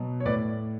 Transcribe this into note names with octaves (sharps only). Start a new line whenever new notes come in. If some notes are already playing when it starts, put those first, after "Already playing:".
Already playing: B2 F#3
C#5
A2 B4 D5